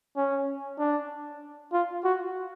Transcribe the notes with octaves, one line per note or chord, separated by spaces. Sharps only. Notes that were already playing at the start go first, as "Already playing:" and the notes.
C#4
D4
F4
F#4